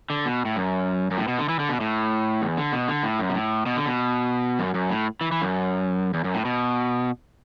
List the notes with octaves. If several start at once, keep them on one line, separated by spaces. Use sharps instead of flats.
D3
B2
A2
F#2
F#2
A2
B2
D3
E3
D3
B2
A2
E2
D3
B2
D3
A2
F#2
B2
A2
B2
D3
B2
F#2
F#2
A2
E3
E3
F#2
E2
F#2
A2
B2